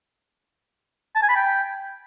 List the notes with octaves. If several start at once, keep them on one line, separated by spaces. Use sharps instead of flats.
A5
G#5
B5
G5